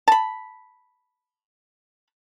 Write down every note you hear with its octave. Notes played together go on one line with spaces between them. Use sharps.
A5 B5